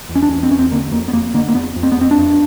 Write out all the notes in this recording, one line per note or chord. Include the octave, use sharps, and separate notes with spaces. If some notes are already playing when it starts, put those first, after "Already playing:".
E2
C#4
D4
E2 C#4
C4
E2 C#4
C4
D3 A#3
F2 A#3
B3
F2 A#3
D3 A#3
A#3
F2 B3
F2
C4
B3
F2 C4
D4
F2